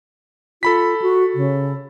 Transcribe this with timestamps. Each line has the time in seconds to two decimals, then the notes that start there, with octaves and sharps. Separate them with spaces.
0.63 F4 A4 B5 B6
1.02 F#4
1.35 C#3